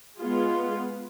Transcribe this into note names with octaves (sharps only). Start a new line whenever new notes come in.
G#3 B3 F4 G#4